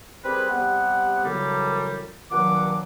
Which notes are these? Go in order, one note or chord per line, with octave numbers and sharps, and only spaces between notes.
G3 C4 G4 G#4 A#4 B4
C3 G3 B3 G4 F#5
F#2 A2 C#3 E3 F#3 G3
G2 A#2 D#3 F#3 F#5 D6